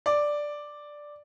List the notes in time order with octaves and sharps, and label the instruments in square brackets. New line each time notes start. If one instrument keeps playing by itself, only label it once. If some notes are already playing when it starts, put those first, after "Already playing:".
[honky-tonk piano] D5